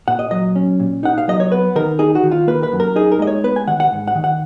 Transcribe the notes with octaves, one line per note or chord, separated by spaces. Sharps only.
A#2 F#5
D#5
F#3 D#5
C#4
A#2
D#4 F#5
F5
F#3 D#5
C#5
B3 B4
D#3 A#4
D#4 G#4
F#4
D#3
F4
A#3 B4
B4
F#2
A#4
D#4 G#4
A#4
G#3 D#5
C#5
B3 B4
G#5
D#3 F#5
F#5
G#2
F#5
D#3
F#5